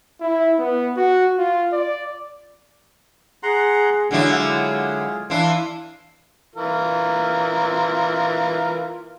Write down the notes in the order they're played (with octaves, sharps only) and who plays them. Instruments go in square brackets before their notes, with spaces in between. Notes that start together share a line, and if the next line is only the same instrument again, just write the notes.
[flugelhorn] E4
B3
F#4
F4
D5
[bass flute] G#4 [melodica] F#5 A#5 C6
[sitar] D3 F#3 E4 [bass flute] G#3 [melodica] F4 G#4
[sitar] E3 E4 [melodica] D4 C6 [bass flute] F5
[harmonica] E3 F4 A#4